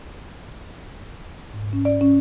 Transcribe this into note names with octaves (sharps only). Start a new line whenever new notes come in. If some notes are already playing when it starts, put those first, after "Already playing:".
G#2
C#4
D5
C#4